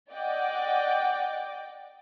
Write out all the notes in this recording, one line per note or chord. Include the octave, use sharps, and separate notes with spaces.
D5 D#5 F#5 G5 D6